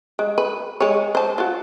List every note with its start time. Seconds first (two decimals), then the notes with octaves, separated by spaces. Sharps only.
0.19 G#3
0.38 B4
0.80 G#3 G#4 C#5
1.15 C5 A5
1.38 F4 F#4